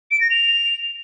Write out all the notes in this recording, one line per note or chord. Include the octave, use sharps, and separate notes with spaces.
D7
A#6
F7